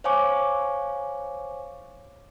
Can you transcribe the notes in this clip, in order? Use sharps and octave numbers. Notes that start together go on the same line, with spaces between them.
C5 C#5 F5 G#5 C#6 D6